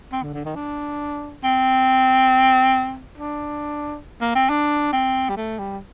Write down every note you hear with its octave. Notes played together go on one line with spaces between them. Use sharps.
C4
D3
D3
D#3
D4
C4
D4
A#3
C4
D4
C4
G3
A3
G3